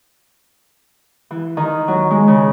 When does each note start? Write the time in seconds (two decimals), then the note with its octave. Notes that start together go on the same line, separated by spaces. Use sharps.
1.31 E3
1.57 D#3
1.88 F#3
2.11 G#3
2.28 C#3